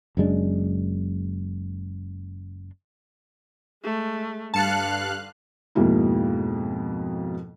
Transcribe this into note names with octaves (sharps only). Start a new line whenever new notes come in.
F#1 F#2 G#3 D4
G#3 A3
G2 D3 F5 A5 F#6 C#7
F2 G#2 B2 A#3 E4